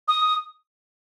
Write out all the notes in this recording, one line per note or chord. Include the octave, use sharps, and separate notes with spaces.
D#6